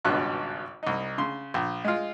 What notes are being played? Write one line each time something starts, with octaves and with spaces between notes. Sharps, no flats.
G#1 C#2 G2 B2 F#6
C2 D#4
C#3 C6
A#1
G#3 F4